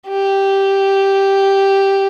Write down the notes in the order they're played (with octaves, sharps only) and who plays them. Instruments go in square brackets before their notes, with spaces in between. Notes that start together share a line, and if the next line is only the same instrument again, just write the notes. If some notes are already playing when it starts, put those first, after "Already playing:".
[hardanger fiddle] G4